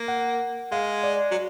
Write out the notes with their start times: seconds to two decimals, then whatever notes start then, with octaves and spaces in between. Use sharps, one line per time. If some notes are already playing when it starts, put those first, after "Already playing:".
Already playing: A#3
0.08 F#5
0.72 G#3 F5
1.04 D5
1.31 F#3